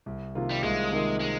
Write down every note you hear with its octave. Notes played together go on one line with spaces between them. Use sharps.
C2
C3 D#3 A#3 F4
G3
C2 G#3
C3 D#3 A#3 F4
G#3